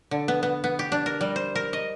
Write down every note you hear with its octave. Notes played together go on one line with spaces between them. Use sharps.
D3
B3
B3
B3
G4
D4
A#4
G3
C5
A#4
D#5